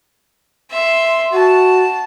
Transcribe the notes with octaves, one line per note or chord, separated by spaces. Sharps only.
E5 C6
F#4 A5